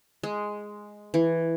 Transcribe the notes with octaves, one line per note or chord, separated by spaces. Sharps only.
G#3
E3